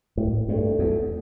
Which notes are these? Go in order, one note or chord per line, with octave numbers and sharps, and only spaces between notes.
A2
G2 A3
E2